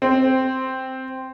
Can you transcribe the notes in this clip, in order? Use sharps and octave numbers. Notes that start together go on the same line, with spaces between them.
C4